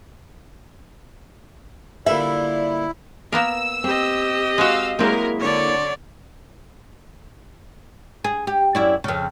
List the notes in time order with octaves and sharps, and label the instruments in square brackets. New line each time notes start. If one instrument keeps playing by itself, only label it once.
[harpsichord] A#2 D3 G3 [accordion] E4 [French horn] D5 [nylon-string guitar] E5
[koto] A#3 B3 A#4 [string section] E6
[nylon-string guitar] C4 [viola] G4 D#5
[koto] G#3 F#4 [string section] F5 E6
[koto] F#3 C4 [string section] G#3 A#4 [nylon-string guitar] A#3 E4
[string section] D3 [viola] C#5 D5
[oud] G#4
G4
F#2 E4 D5
F2 C#3